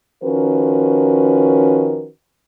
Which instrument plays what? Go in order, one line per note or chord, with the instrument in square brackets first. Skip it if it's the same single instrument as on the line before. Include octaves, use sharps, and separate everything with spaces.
[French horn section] D#3 F3 C#4 F#4 A#4 B4